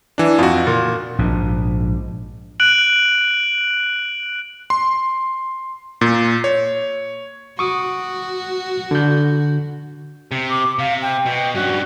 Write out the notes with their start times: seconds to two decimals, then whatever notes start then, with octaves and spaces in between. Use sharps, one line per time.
0.18 E3 D4
0.38 F2 F4 F#4
0.67 A#2
1.19 A#1 G#2
2.60 F#6 D7 F#7
4.70 C6
6.01 A#2
6.44 C#5
7.59 F#4 C#6 D#6
8.91 D3 G6
10.32 C3
10.50 D6
10.79 C3 F5
11.02 G5
11.26 B2
11.55 G2 C#4 F#4